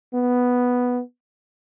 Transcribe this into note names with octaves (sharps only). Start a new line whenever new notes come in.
B3